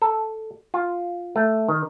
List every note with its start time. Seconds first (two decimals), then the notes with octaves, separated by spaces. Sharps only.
0.02 A4
0.74 F4
1.36 A3
1.68 D#3